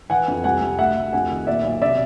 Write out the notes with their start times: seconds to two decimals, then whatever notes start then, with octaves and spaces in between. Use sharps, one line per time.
0.10 E3 F#5 G#5
0.28 F2
0.44 C2 F#5 G#5
0.61 C2
0.78 D2 E5 F#5
0.96 D2
1.13 F2 F#5 G#5
1.30 D#3
1.47 A#2 D5 E5
1.64 B1
1.81 C3 D5 E5